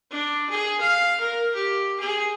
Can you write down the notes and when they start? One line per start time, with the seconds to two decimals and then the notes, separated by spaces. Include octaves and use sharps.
0.11 D4
0.50 G#4
0.80 F5
1.20 A#4
1.54 G4
2.00 G#4